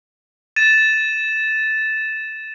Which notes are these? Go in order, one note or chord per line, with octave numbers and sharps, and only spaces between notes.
A6 D#7 E7